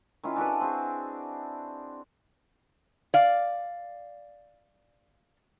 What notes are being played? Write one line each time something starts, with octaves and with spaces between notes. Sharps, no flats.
D#3 C#4 E4 F4
D4 F#4 A4 B4
C4 G#4
D5 F5